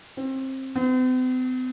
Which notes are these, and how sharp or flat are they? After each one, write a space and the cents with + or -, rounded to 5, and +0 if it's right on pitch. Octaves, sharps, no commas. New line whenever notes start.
C4 +25
C4 -45